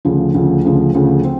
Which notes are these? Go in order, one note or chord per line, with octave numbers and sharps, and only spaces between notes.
D2 C#3 F3
D2 C#3 F3
D2 C#3 F3
D2 C#3 F3
C4